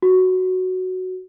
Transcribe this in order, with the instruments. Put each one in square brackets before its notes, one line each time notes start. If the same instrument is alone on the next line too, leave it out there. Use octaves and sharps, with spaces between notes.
[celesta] F#4